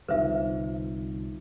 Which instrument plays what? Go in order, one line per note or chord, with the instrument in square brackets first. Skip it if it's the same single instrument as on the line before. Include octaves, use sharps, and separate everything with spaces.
[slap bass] C2 [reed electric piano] D3 D#4 F4 [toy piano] B4 C5 E5